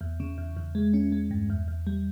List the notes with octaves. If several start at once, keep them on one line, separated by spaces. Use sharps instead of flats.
E2
C#3
E2
E2
G#3
C#4
G#3
G2
E2
E2
G3